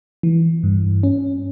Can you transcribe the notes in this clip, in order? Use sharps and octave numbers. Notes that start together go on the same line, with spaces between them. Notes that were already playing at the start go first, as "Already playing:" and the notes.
E3
G2
C#4